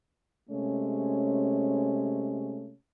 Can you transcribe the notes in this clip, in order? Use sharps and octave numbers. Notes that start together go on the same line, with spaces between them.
C3 G#3 A3 C#4